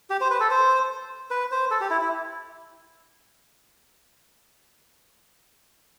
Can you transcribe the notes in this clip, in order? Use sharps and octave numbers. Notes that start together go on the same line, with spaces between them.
G4
C5
B4
A4
C5
B4
C5
A4
G4
E4
E4